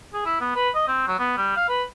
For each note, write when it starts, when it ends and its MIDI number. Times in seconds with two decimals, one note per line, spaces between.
0.14 0.23 68
0.25 0.38 64
0.41 0.54 59
0.56 0.69 71
0.75 0.87 75
0.88 1.06 60
1.08 1.17 54
1.19 1.35 59
1.37 1.56 55
1.56 1.69 77
1.69 1.84 71